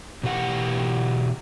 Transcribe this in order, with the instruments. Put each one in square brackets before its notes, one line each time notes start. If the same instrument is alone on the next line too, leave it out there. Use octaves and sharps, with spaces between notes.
[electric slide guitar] B2 E3 G4 F#5